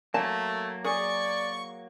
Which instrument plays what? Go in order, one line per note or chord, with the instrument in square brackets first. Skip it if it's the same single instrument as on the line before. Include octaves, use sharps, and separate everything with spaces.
[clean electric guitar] F#3 A#3 [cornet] A3 [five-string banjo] A5
[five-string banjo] G#4 [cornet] D5 [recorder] C#6